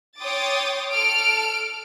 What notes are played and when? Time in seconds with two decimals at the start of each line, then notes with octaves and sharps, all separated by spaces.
0.19 C#5 G5 C6 D6 D#6 A6
0.92 A4 F6 D7